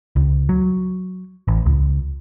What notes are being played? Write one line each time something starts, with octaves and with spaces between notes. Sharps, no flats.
C#2
F#3
A1
C#2